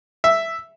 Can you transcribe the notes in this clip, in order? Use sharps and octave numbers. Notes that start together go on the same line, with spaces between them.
E5